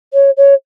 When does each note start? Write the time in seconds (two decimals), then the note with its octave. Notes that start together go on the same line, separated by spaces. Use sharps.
0.14 C#5
0.37 C#5